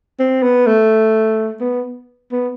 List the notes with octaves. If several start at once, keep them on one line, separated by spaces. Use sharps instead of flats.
C4
B3
A3
B3
B3